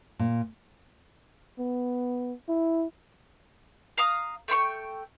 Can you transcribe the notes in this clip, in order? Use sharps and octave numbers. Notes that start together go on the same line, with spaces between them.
A#2
B3
E4
F5 A#5 D#6
A3 G5 C6 C#6